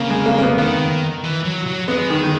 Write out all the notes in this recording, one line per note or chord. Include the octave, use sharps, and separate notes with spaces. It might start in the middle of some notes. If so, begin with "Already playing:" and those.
Already playing: C#3 A#3
G#3
A#3
A#3
B3
D#3 B3
E3
F#3
F#3
G#3 B3
D#3
D#3